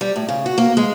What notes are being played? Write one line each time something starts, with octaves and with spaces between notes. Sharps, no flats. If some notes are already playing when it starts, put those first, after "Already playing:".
G3
A2
C#3
F#4
A#3
G#3